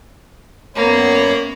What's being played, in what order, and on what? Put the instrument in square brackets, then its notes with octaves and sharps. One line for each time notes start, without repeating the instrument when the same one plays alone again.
[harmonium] F#2 C#5 [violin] A#3 [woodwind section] B3 [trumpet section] D5 A#5 B5